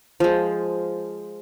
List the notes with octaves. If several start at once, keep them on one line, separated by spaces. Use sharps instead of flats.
F3 G#3